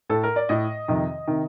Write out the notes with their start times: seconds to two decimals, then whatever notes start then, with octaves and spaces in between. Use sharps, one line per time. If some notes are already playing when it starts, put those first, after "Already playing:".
0.09 A2 A4
0.23 A#4
0.36 D5
0.49 A2 D#5
0.88 F2 C3 D#3
1.27 C3 D#3